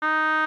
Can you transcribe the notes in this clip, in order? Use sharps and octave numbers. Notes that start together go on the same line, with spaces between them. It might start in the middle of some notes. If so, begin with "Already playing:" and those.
D#4